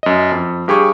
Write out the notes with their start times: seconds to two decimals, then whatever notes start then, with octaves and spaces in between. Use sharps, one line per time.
0.03 F#2 D#5
0.32 F2
0.68 G2 G4 G#4 C#6